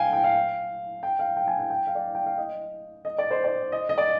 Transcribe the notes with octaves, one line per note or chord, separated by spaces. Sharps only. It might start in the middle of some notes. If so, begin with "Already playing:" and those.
Already playing: F5 G5 G#5
G5
F5
G5
F5
G5
G#5
G5
G5
F5
D5
G5
F5
D#5
D#5
D5
C5
D5
D#5
D#5
D5